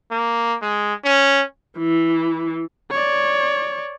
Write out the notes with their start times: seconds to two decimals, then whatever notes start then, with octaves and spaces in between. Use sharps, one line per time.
0.11 A#3
0.62 G#3
1.04 C#4
1.78 E3
2.91 C#5 D5